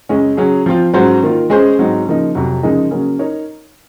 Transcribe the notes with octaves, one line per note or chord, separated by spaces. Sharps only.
F#2 C#3 G#3 C#4
C#3 F#3 C#4 G#4
F3 C4 F4
G#2 F#3 C#4 F#4 C5
D#3 A#3 F4
G#3 C#4 G#4 C5
G#2 F#3 C4 D#4
C#3 F3 A#3 D#4
F2 C3 F#3
C#3 F3 G#3 D#4 A#4
C#3 F#3 A#3 C#4
D#4 A#4 C#5